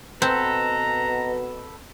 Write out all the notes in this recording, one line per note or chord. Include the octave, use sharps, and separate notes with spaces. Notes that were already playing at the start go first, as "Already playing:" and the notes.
B2 C4 A4 B4 A#5